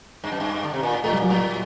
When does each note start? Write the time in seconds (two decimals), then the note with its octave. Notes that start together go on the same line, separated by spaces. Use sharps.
0.24 G2
0.32 F#2
0.40 G2
0.63 D3
0.74 C3
0.83 A#2
0.93 A2
1.04 A2 A3
1.12 G3
1.17 A#2
1.22 F#3
1.30 A2 G3